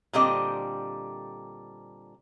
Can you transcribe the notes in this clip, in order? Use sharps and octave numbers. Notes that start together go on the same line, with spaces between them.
A#2 D3 G3 C4 D#5